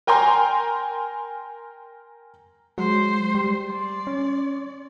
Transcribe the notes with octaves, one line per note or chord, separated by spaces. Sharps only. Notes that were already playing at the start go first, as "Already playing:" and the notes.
A#4 G5 G#5 A#5 C6
F#3 G#3 C5
G3
D5 C6
C#4